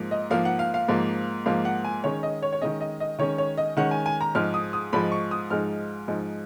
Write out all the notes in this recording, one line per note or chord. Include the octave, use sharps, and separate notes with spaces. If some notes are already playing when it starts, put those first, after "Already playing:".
Already playing: G#2 F3 A#3
D#5
G#2 F3 A#3 F5
F#5
F5
F5
G#2 F3 A#3
G#2 F3 A#3 F5
F#5
G#5
D#3 G#3 C#4 C#5
D#5
C#5
C#5
D#3 G#3 C#4 D#5
D#5
D#5
D#3 G#3 C#4 C#5
C#5
D#5
D#3 G#3 C#4 F#5
G#5
G#5
A#5
G#2 F3 G#3 D#4 F6
D#6
D#6
G#2 F3 G#3 D#4 B5
C#6
D#6
G#2 F3 G#3 D#4 F6
G#2 F3 G#3 D#4